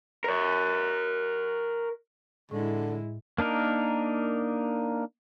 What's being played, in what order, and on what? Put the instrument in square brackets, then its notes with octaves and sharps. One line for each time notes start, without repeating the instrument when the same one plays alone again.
[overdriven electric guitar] A#4 C#5
[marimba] A2 [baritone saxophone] D3 [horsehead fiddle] G#3 E4
[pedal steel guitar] A#3 D4 D#4 A#4